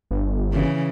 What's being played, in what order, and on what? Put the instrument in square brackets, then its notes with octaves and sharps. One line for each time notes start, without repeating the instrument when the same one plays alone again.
[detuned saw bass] G1
[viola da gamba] C#3 E3